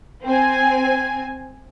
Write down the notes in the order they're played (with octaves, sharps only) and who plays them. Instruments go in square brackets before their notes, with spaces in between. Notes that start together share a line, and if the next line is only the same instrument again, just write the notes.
[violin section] C4 G#5